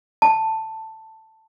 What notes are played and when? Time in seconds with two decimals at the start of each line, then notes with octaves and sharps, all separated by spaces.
0.22 A5